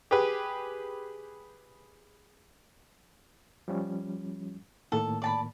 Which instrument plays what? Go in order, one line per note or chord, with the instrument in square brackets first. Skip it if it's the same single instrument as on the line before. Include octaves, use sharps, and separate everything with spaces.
[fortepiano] G4 G#4 B4
[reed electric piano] F3 G3 C#4
[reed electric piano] A2 D#3 A#3 [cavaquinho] A4
[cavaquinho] D5 A5 B5